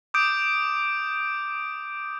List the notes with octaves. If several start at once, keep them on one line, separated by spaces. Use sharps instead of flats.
D6 D#6 G6 D7